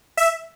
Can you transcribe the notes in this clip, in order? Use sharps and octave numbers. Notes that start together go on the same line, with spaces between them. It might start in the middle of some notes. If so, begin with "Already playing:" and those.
E5